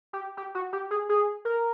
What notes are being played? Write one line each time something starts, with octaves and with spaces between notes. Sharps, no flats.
G4
G4
F#4
G4
G#4
G#4
A#4